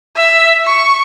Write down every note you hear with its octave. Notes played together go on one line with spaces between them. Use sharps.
E5
C#6